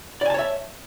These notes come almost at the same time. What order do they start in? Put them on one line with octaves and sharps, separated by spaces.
D5 G#5 A5 C#5 E5